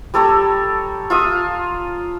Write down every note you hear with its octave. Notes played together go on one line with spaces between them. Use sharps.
G3 A4 C#5 A#5
F4 E5 D#6